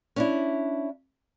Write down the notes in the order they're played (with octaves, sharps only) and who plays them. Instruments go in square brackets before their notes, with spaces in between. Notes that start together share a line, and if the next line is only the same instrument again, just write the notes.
[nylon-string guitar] C#4 D4 E4